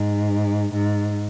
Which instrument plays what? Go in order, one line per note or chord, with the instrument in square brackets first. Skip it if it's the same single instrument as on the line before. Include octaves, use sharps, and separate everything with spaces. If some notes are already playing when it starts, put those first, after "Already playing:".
Already playing: [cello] G#2
G#2